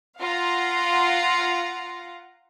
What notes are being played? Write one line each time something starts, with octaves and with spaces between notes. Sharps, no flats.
F4 F5 F#5 A#5